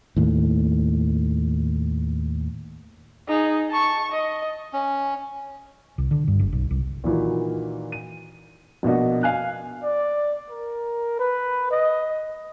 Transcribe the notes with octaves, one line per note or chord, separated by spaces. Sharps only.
D#2 A2
D#4 G#4
A5 C#6
D#5
C#4
C2
D3
G2
F#1
B1
C2
A#2 D#3 E3 F#3
D#7
A#1 B2 A#3 D4 F#4 D#5
F5 G#5 F#6
D5
A#4
B4
D#5